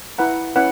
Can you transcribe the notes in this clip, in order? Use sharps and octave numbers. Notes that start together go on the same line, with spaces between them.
E4 B4 F#5 A#5
C#4 E4 B4 F#5